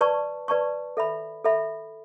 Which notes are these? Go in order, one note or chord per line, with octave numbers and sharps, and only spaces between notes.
B4 D5 A5 C#6
B4 D5 A5 C#6
A4 E5 B5
A4 E5 B5